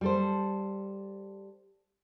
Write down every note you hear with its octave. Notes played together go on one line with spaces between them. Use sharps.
G3 A4 C5